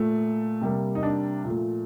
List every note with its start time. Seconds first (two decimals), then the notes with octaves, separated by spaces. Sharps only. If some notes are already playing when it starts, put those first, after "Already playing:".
Already playing: A#2 A3
0.61 C3 G3 A#3
0.95 D#4
1.03 D4
1.44 A#2 F3 A3